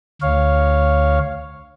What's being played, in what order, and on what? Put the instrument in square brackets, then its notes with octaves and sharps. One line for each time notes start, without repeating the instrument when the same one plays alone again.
[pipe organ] D2 C#5 F5